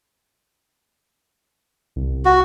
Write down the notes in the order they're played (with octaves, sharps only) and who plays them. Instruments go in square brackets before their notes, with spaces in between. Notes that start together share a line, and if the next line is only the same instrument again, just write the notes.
[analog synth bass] C2
[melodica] F#4